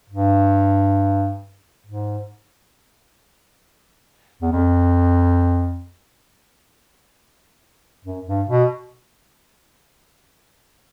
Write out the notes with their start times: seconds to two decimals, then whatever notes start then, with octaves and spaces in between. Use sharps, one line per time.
0.10 G2
1.86 G#2
4.42 E2
4.52 F2
8.05 F#2
8.27 G2
8.49 B2